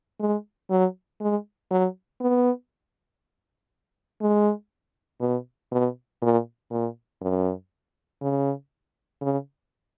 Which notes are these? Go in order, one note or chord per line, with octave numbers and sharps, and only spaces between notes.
G#3
F#3
G#3
F#3
B3
G#3
B2
B2
A#2
A#2
F#2
C#3
C#3